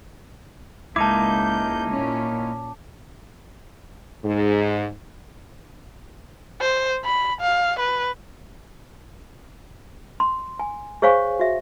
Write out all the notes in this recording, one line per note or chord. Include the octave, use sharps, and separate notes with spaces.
C#2 A#3 D#4 E4 A5 D6 G6
A#2 C#4
G#2
C5
B5
F5
B4
C6
G#5
G#4 C5 C#5 F5 G#5 C#6
F#4 E5